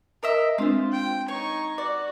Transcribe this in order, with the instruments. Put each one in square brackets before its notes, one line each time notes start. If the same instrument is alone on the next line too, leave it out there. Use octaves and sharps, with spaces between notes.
[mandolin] A#4 D#5 E5
[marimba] G#3 C4 D4 [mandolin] F4 C5
[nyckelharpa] G5
[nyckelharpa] D#4 C#6 [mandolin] C#5
[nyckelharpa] F#4 [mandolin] D5